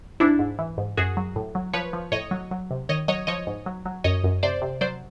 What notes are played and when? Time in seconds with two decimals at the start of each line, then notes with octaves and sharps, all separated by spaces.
0.20 G#2 D4 E4
0.39 G#2
0.59 E3
0.78 G#2
0.97 F#2 F#4 G#4
1.17 F#3
1.36 A2
1.55 F#3
1.73 F3 B4 C#5
1.93 F3
2.12 A2 C#5 D#5
2.31 F#3
2.51 F#3
2.71 C3
2.89 D#3 C#5 D#5
3.08 F#3 C#5 D#5
3.27 F3 C#5 D#5
3.47 G#2
3.66 F#3
3.86 F#3
4.04 F#2 C#5 D#5
4.24 F#2
4.43 C3 C5 D5
4.62 C3
4.81 F#3 C5 D5